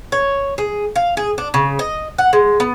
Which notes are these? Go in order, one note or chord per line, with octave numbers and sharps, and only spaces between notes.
C#5
G#4
F5
G#4
D4
C#3
D#5
F#5
G#3
B3